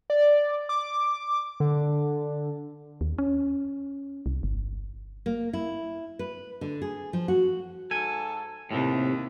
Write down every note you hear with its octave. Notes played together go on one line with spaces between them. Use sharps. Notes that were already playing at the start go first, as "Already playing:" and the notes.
D5
D6
D3
D#2
C#4
C2
G1
A#3
E4
B4
D3
G#4
F3
F#4
G#2 A4 G#5
D#2 A2 C3